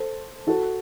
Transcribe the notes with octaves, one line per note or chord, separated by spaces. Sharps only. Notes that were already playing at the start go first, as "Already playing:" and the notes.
Already playing: A4 C5
F#4 A4